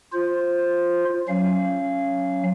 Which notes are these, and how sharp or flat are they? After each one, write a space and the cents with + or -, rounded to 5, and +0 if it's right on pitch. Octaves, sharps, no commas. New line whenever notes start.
F4 +0 C5 +5
F#3 +0 C#4 +0 F5 -25